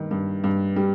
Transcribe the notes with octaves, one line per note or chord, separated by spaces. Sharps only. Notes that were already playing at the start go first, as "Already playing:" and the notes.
Already playing: G2 D#3
G2
G2
G3